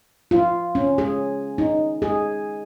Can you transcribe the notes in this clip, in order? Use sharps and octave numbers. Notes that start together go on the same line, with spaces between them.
F4
C#4
G#4
D#4
G#4